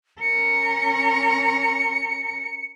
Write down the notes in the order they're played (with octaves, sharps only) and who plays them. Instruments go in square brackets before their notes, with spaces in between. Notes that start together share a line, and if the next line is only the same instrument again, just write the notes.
[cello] C#4 A#4 [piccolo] C#7